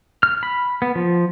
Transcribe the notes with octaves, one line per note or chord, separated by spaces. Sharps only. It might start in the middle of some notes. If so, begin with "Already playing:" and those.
F6
B5
B3
F3